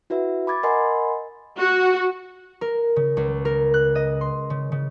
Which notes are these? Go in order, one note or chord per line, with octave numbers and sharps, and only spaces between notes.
E4 F#4 B4 E5
B5 D6 G#6 A6
A#4 D#5 F#5 G#5 B5 C6
F#4
A#4
C#3
C#2
A#4
F#6
D#5
C6
C#3
C#3